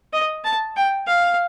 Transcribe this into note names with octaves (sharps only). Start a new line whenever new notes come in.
D#5
A5
G5
F5